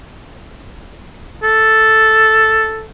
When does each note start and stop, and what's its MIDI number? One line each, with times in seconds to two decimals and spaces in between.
1.43 2.87 69